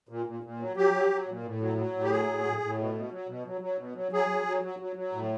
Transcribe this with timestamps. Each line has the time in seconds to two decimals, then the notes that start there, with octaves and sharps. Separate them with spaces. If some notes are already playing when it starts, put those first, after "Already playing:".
0.09 A#2
0.26 A#2
0.43 A#2
0.59 F#3
0.77 F#3 G4
0.93 F#3
1.10 F#3
1.27 A#2
1.43 A2
1.61 F#3
1.78 F#3
1.94 A2
2.04 G4
2.10 F#3 G#4
2.27 A2
2.45 A2
2.61 A2
2.79 B2
2.94 B2
3.12 F#3
3.28 B2
3.46 F#3
3.61 F#3
3.78 B2
3.95 F#3
4.12 F#3 G#4
4.29 F#3
4.46 F#3
4.63 F#3
4.79 F#3
4.96 F#3
5.12 A2